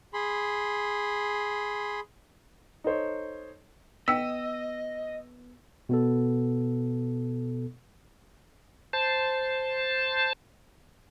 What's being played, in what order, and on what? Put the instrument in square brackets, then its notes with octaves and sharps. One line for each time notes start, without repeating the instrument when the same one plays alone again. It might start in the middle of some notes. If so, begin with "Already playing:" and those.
[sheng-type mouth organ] G#4 B5 C6
[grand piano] D#4 A4 C5 C#5
[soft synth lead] B3 [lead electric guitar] D#5 [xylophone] G5 B6 [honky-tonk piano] E6
[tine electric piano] B2 B3 A4
[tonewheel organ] C5 A5